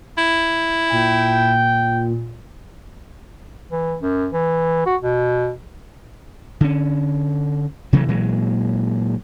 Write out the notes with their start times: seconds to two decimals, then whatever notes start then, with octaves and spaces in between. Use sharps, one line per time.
0.18 E4
0.92 A#2 G5
3.71 E3
4.02 F#2
4.32 E3
4.86 F#4
5.03 B2
6.61 D3 C#4
7.93 C3 E3 F#3 A3
8.08 A#2 E3 F#3 G#3